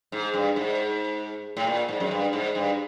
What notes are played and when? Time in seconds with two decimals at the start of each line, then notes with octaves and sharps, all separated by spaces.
0.12 G#2
0.34 G2
0.56 G#2
1.57 A2
1.67 A#2
1.88 G#2
2.00 F#2
2.11 G2
2.33 G#2
2.55 G2